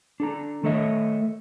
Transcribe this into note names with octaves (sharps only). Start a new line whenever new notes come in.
D4 A4 A#5
D#3 A3 A4 C#5 D#5 E5